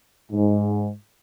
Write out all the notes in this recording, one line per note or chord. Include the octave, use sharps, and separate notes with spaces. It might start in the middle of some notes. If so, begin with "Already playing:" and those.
G#2